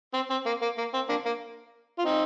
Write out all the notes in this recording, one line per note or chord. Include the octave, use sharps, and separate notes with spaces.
C4
C4
A#3
A#3
A#3
C4
A#3 D4
A#3
F4
C4 D#4